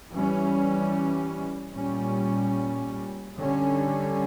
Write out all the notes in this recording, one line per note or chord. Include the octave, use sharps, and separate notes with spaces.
E3 G3 C#4
A#2 G3 C#4
D3 G3 C#4